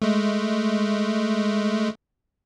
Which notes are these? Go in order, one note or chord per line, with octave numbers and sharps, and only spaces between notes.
G#3 A3